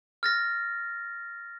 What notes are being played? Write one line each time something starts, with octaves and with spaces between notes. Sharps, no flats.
F6 A6 A#6